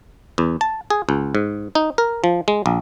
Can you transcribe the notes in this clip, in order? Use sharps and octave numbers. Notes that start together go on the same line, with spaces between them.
E2
A5
G#4
C#2
G#2
D#4
A#4
F3
G#3
A#1